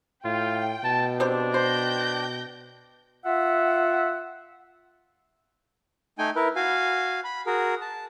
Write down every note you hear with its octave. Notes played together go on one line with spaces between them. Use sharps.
A2 F4 G5
B2 A5
C4 D4 G4 C5
C5 G5 G6 A#6
F4 E5 F#5
A3 D#4 G5 G#5
E4 A#4 B4
F#4 F5 G#5
B5
F#4 G#4 A#4
A5